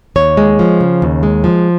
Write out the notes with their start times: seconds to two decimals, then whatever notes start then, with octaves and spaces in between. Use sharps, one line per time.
0.16 D#2 C#5
0.37 G#3
0.59 F3
0.80 C#3
1.02 D#2
1.23 G#3
1.44 F3